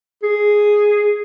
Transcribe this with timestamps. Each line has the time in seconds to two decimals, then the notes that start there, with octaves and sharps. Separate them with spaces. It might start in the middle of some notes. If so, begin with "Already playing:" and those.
0.23 G#4